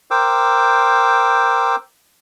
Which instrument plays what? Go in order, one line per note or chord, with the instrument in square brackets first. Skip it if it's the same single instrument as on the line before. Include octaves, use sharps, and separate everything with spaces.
[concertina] A#4 C5 G5 D6 E6